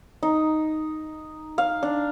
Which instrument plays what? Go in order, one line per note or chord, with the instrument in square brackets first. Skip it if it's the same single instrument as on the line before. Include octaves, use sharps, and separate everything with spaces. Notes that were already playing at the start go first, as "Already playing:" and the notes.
[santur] D#4
F5
D4